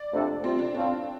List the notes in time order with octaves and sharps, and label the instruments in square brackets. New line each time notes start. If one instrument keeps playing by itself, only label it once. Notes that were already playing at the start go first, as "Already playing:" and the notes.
Already playing: [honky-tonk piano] D5
[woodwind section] F2 C3 A3 D4 A4
[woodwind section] C3 G3 F4 [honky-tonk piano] C4
[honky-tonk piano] D4
[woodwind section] A2 A3 C4 F4 [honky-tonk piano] D4